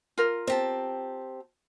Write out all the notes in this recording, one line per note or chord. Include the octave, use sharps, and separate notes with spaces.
F4 A#4
C4 G4 A5